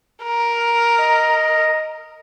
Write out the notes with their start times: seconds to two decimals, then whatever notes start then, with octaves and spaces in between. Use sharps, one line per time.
0.23 A#4
0.99 D#5